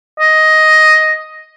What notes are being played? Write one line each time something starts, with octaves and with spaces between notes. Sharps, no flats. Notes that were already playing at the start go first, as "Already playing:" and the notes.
D#5